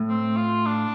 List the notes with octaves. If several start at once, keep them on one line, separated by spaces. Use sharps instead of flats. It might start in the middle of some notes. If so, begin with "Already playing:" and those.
Already playing: A2
C4
F4
D4